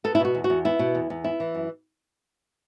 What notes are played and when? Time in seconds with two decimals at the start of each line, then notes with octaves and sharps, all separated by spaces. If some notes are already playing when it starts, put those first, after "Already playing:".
0.04 B3 A4
0.15 E4
0.20 B2 F#4
0.35 E2
0.44 F#4
0.50 E2
0.65 B3 E4
0.79 B2
0.95 E2
1.10 E2
1.24 B3 E4
1.40 E3
1.55 F#2